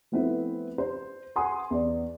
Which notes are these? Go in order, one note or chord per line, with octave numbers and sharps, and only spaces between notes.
F3 A3 B3 C4 E4 B4
C5
F#5 G#5 C6 D#6
E2 D5